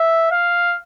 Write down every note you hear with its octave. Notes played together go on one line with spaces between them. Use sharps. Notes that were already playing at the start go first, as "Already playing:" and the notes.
Already playing: E5
F5